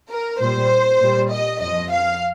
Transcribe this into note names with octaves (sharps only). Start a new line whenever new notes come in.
A#4
A#2 G3 C5
A#2 G3
D#5
F2 F3 D#5
F5